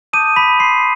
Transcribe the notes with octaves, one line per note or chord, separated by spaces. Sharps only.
A5 D6 D#6 G6 D#7
B5 B6
C6 C7